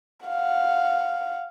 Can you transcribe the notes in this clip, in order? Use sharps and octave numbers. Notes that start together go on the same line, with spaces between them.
F5 F#5